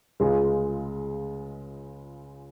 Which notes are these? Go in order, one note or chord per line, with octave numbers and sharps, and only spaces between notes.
C#2 C#3 G#3 C#4 F4